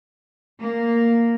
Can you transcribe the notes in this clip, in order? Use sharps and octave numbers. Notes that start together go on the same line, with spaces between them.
A#3